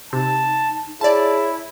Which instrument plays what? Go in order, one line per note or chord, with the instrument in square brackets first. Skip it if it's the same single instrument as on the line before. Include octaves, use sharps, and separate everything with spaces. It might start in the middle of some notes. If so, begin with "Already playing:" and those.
[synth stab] C3 [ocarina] D#4 [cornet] A5
[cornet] E4 [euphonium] G#4 [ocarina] C#5 [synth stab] D5 A5